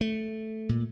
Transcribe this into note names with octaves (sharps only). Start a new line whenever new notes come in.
A3
A#2